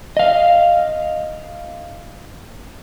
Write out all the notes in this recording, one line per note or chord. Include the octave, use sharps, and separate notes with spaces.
D#5 F5